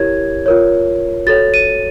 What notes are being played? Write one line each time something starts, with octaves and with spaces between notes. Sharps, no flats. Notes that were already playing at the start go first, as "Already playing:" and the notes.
Already playing: E4 G4 A#4 C#5 G#6
F4 A#4 C#5
F#4 A4 C#5 A6
D#7